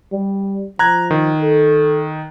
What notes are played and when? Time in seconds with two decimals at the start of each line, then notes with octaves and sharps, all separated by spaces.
0.12 G3
0.79 F3 A#5 F#6 G#6
1.11 D#3
1.41 A4